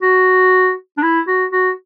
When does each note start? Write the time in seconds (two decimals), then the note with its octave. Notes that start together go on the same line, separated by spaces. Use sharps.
0.02 F#4
0.98 D4
1.03 E4
1.27 F#4
1.52 F#4